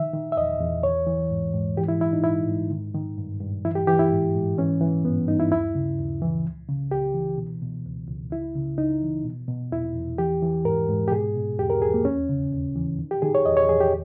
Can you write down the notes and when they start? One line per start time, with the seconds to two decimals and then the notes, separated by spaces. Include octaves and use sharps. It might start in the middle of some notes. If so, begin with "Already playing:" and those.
Already playing: D#3 E5
0.13 D#3
0.32 E5
0.37 E2 D#5
0.60 E2
0.83 E3 C#5
1.07 E3
1.31 G#2
1.54 G#2
1.77 E3 G4
1.88 E4
2.00 E3 E4
2.13 D#4
2.24 G#2 E4
2.48 G#2
2.71 D#3
2.95 D#3
3.18 G2
3.40 G2
3.65 E3 E4
3.75 G4
3.87 E3 G4
3.99 E4
4.11 G#2
4.35 G#2
4.58 E3 C#4
4.81 E3
5.05 G2 B3
5.28 G2 D#4
5.40 E4
5.51 D#2 E4
5.75 C#3
5.98 D#2
6.22 E3
6.44 C#2
6.68 C#3
6.91 C#2 G4
7.14 E3
7.38 B2
7.62 B2
7.86 C#2
8.08 C#2
8.31 C#2 E4
8.55 C#3
8.78 C#2 D#4
9.02 E3
9.24 B2
9.48 B2
9.71 E2 E4
9.96 E2
10.18 E3 G4
10.42 E3
10.65 G#2 A#4
10.89 G#2
11.08 G4
11.11 B2 G#4
11.35 B2
11.59 E2 G4
11.70 A#4
11.82 E2 G#4
11.94 A#3
12.05 D#2 C#4
12.29 C#3
12.52 D#2
12.76 E3
12.99 D#3
13.11 G4
13.22 D#3 G#4
13.35 C#5
13.46 E2 D#5
13.57 C#5
13.68 E2 G#4
13.80 G4